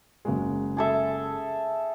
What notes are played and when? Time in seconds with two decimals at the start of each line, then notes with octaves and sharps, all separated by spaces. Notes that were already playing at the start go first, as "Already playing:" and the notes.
0.25 F#1 F#3 G#3
0.77 G#4 A4 E5